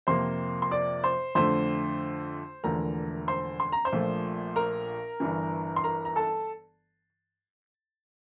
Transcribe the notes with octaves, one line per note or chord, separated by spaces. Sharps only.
F2 C3 F3 A#3 C5 C6
C6
D5 D6
C5 C6
F2 D3 A3 C5 C6
E1 E2 D3 F3 A3 A#4 A#5
C5 C6
C6
A#5
C5 C6
A#1 A#2 F3 A3
A#4 A#5
G1 G2 E3
C6
A#4 A#5
A#5
A4 A5